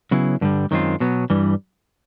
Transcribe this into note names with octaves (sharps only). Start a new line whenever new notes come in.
C#3 F#3 B3 E4 G#4
G2 D3 G3
F#2 D#3 G#3 C4 F4
B2 F#3 B3
G2 E3 G3